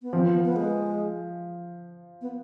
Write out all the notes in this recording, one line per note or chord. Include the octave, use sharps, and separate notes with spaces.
B3
F3 C4
B3
B3
G#3
B3